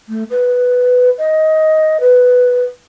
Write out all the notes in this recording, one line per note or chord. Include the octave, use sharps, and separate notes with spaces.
A3
B4
D#5
B4